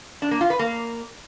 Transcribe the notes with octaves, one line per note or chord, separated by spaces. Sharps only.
D4
A#3
F4
B4
A#3